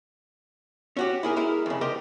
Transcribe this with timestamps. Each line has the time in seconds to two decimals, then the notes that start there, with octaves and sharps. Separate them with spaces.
0.97 C#4 F#4 G4
1.23 E4 G#4 A#4
1.36 G#3 E4 A#4
1.66 F2 C#3
1.81 G4 A#4 C5 D#5 G5